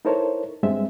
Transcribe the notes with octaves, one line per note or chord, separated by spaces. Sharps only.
D#4 E4 A4 A#4 C5 C#5
G2 G#3 C4 E5